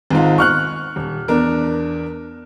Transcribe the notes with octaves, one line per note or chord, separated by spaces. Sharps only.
G#1 G#2 F4
C#6 F6 F#6
D#1
E2 D4 A#4